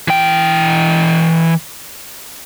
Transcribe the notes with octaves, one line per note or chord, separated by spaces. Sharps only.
E3 G5